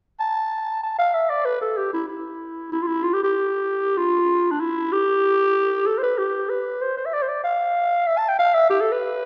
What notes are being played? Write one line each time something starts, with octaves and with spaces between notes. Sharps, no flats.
A5
A5
F5
E5
D5
B4
A4
G4
E4
E4
E4
F4
E4
F4
G4
G4
F4
D4
E4
G4
A4
C5
B4
G4
B4
C5
C5
E5
D5
C5
D5
F5
E5
A5
G5
F5
E5
G4
A4
B4